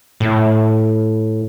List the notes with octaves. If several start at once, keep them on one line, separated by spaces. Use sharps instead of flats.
A2